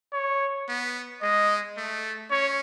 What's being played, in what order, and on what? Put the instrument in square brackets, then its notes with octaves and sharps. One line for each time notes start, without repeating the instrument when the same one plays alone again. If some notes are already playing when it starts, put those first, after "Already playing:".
[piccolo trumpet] C#5
[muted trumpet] B3
[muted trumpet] G#3 [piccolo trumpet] D#5
[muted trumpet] A3
[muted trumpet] C#4 [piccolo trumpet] C#5